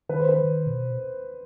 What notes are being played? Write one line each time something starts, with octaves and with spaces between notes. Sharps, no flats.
D#3 B4
C5
B4
D#3
B2